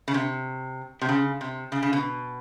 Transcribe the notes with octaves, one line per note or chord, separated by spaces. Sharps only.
C#3
C3
C3
C#3
C3
C#3
C#3
B2